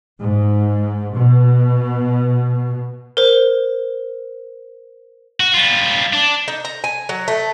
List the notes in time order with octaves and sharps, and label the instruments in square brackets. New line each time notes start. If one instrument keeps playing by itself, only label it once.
[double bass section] G#2
B2
[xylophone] A#4 C5
[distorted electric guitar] F#4
G3 F4
D4
[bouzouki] D#4
A#5
G#5
F#3
A3